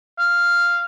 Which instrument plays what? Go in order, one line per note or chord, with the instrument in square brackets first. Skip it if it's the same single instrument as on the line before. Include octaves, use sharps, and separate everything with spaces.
[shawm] F5